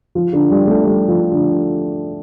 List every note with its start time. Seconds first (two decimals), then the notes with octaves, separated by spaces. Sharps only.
0.15 F3
0.33 D3
0.50 G3
0.67 A3
0.85 G3
1.08 F3
1.32 D3